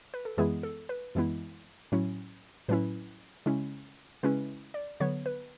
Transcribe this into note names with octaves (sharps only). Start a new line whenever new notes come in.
B4
A4
F#2 E3 G#3 B3 E4 G#4
A4
B4
F#2 E3 G#3 B3 E4
A2 F#3 C#4 E4
A2 F#3 C#4 E4 B4
C#3 G#3 C#4 E4
C#3 G#3 C#4 E4 B4
D5
D3 F#3 B3 C#5
B4